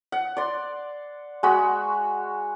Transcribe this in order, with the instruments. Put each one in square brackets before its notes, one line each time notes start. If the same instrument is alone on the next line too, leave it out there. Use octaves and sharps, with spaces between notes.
[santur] F#5
D5 C6
G#3 F#4 B5